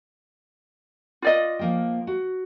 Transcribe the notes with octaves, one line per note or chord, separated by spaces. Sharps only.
F4 D5 D#5
F3 A#3 G5
F#4